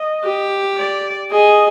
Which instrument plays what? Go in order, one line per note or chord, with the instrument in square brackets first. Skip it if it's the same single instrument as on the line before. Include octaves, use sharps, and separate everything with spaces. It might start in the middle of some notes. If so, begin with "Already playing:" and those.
Already playing: [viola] D#5
[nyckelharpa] G4
[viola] D5
[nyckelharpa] G#4 [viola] D#5